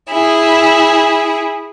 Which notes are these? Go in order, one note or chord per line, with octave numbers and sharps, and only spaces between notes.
E4 G#4